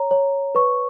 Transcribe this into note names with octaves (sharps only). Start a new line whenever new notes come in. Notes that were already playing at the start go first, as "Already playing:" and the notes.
Already playing: C#5 A#5
C#5
B4 C#6